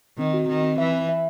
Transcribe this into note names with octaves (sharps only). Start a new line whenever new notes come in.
D#3 C4
F#4
D#3 C4
C4
E3 E5
E5
E5